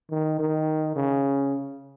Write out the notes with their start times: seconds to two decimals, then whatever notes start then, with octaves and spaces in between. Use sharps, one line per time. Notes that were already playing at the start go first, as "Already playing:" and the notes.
0.11 D#3
0.40 D#3
0.96 C#3